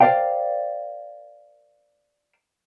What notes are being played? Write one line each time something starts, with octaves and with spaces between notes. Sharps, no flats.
A#4 C5 D5 F5 G5